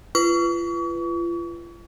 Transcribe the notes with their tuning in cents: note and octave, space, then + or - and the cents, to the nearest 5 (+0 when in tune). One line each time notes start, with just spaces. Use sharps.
F4 -35 B4 +0 C#6 +40